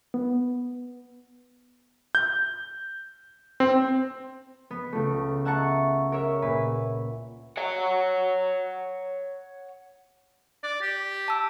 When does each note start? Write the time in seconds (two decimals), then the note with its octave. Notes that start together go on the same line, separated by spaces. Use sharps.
0.14 B3
2.15 G6
3.60 C4
4.71 B3
4.92 C#2 A3
5.45 E5 F#5 A5 A#5 C#6
6.12 A#4 C#5 E5
6.42 A#2 B4
7.58 C#5 F#5
10.63 D5
10.81 G4
11.28 A5 E6 D7